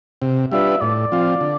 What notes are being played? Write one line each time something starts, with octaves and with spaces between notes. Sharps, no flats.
C3
G3 D4 F4 B4 E5
A2 D5
F3 C4 F4
D3